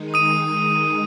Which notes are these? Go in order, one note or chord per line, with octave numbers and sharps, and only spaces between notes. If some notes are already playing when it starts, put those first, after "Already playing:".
Already playing: D#3 G#3 D#4
D#6 D#7